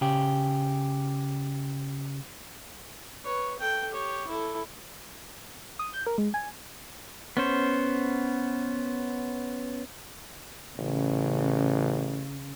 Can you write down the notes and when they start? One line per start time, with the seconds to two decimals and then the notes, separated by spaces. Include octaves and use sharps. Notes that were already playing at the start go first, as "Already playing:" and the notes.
0.01 C#3 G4
3.23 B4 C#5
3.59 A4 G5
3.92 G4 C#5
4.27 E4 A4
5.79 D#6
5.94 G6
6.07 A#4
6.18 G#3
6.34 G#5
7.37 B3 C#4 C5
10.79 A1 C#3